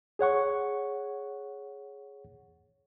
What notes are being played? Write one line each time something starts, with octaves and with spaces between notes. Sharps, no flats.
G#4 C#5 F#5 C#6